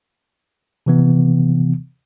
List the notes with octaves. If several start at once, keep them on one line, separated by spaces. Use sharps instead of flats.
C3 E3 B3